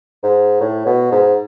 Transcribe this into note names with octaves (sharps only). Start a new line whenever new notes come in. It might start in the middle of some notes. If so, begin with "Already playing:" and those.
G#2
A2
B2
G#2